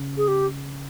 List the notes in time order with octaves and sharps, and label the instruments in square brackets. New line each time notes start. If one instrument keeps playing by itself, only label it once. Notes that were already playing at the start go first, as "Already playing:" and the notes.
Already playing: [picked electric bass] C#3
[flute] G#4
G4